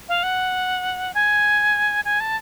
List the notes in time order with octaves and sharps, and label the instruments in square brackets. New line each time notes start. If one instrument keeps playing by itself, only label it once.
[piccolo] F5
F#5
G#5
G#5
A5